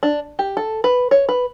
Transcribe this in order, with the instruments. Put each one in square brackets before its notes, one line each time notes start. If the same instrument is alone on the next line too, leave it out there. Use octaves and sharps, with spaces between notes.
[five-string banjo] D4
G4
A4
B4
C#5
B4